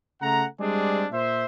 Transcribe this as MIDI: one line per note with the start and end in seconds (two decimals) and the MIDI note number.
0.22 0.45 49
0.22 0.45 57
0.22 0.45 78
0.22 0.45 82
0.60 1.06 55
0.60 1.06 56
0.60 1.06 60
0.60 1.06 62
0.60 1.06 68
0.60 1.06 74
1.12 1.46 46
1.12 1.46 72
1.12 1.46 76